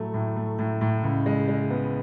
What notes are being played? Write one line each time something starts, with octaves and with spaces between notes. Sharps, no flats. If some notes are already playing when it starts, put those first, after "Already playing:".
Already playing: A2 F#3 A3
A2
A3
A2
A2
C#2
G#3
G#3
B3